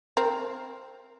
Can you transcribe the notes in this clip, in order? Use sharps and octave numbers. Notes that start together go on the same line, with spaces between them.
C4 A#4